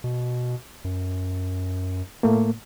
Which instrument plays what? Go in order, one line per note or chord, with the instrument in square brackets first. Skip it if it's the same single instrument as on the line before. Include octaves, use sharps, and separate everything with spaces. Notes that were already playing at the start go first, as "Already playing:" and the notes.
[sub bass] B2
F#2
[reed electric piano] A2 A3 A#3